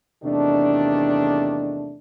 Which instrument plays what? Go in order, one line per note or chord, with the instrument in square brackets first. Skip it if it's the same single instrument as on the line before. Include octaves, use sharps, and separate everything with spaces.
[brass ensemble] E2 C3 D#3 A3 D4